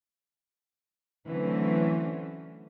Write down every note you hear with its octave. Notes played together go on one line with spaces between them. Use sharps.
D3 E3 F#3 A3 C4 C#4